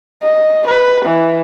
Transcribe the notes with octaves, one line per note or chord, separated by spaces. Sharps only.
D#5
B4
E3